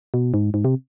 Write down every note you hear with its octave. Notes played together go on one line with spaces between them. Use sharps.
B2
G#2
G#2
C3